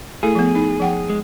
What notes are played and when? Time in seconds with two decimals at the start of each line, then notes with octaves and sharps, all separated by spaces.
0.23 A3 E4 G#4 A4
0.35 F3 B3
0.55 D#4
0.80 F3 F#5 G5
1.10 G#3